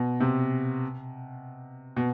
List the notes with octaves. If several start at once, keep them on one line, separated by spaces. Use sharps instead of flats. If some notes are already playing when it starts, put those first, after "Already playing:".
Already playing: B2
C3
B2